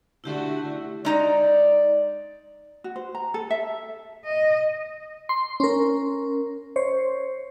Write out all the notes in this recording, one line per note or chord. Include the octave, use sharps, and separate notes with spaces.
D3 A3 E4 F#4 G4 E5
G#3 D#4 D5 A#5
F#4
C5
A#5
A4
E5
D#5
C6
C#4 A#4
C5 C#5